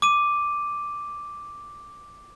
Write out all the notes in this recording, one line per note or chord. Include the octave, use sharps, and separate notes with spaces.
D6 D#7